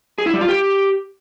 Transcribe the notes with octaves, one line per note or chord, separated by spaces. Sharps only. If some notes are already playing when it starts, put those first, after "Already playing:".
G#4
E4
G3
F4
G4